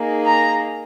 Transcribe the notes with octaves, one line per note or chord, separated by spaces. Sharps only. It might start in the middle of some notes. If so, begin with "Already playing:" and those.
Already playing: A#3 D#4 G#4
A#5